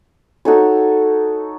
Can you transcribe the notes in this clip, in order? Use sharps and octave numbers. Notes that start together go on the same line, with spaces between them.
D#4 F#4 A4 C#5